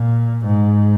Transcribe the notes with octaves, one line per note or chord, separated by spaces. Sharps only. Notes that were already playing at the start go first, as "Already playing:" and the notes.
Already playing: A#2
G#2